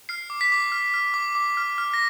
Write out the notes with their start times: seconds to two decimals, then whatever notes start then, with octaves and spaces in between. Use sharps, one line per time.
0.09 F6 C7
0.30 D6
0.41 B6
0.52 D6
0.72 F6
0.94 F6
1.14 D6
1.35 D6
1.57 F6
1.78 F6
1.94 A#6